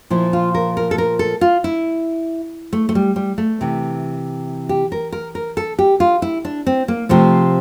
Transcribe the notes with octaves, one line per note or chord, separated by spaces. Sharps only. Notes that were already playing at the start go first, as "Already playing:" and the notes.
A#2 F3 E4
F4
A#4
A#4
A4
A#4
A4
F4
E4
A3
A3
G3
G3
A3
C3 E3
G4
A#4
A#4
A#4
A4
G4
F4
E4
D4
C4
A#3
C3 F3 A3